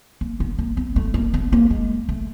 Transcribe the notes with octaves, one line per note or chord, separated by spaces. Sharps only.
A#3
B3
A#3
B3
A3
A#3
B3
A#3
G#3
A3